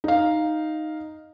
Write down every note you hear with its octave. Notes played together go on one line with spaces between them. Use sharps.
D#4 F5